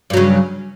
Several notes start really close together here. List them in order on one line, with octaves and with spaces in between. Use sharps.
G2 F#3 C#3